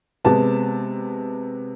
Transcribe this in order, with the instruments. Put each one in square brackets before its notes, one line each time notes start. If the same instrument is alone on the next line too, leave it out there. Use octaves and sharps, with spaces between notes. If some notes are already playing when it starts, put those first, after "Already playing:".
[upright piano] C3 G#3 B3 A5